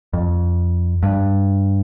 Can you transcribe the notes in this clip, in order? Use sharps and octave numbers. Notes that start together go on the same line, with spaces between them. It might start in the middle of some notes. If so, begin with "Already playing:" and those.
F2
G2